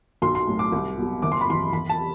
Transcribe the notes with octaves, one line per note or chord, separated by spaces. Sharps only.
B1 C6
C6
A2 F#3
D6
C2
B2 F#3
F#1 D6
C6
B5
F#2 E3 C6
E2 B5
A5
C3